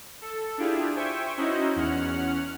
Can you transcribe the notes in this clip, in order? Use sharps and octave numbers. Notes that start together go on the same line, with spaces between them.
A4
D4 E4 F4 G4 G#4
C5 E5 G5 G#5 C#6
C#4 D#4 E4 F#4 C5 D#5
E2 C#4 F#5 F6